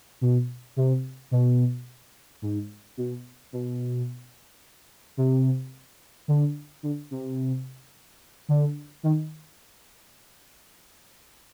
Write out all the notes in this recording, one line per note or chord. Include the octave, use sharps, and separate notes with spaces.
B2
C3
B2
G#2
B2
B2
C3
D3
D3
C3
D3
D#3